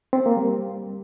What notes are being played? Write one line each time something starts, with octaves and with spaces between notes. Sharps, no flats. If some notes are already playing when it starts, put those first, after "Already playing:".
C4
A#3
G3